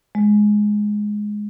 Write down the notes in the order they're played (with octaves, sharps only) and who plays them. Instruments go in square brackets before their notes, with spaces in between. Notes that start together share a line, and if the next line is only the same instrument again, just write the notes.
[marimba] G#3